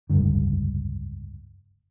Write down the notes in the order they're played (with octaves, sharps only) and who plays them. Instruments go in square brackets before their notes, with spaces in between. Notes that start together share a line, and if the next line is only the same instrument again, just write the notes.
[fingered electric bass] F1 C#2 G2 D3